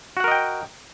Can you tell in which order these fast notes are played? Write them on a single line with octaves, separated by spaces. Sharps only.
F#4 F#5 A#4 D#5 G5